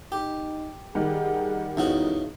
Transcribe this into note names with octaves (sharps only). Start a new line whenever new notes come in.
D#4 G4
D#3 G3 G#4 F#5
E2 C#3 D#4 E4 F#4